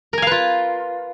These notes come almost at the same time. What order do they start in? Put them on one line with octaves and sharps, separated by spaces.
A#4 G#5 F5 B4 F4